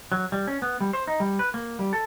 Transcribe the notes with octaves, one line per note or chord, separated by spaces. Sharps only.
F#3
G3
C#4
B3
G3
C5
D#4
G3
B4
A#3
G3
A4